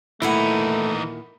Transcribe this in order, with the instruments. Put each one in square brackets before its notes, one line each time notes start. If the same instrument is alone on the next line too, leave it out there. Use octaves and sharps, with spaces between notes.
[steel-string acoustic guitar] D#2 A#2 F#5 [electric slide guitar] E3 D#4 [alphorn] A3 [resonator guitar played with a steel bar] E4